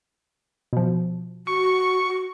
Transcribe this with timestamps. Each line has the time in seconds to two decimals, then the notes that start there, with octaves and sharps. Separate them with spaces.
0.73 B2 F3
1.47 F#4 C#6